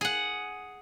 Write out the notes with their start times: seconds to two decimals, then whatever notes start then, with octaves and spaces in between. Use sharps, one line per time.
0.01 G#4 F#5